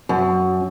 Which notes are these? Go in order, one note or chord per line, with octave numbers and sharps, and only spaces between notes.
F#2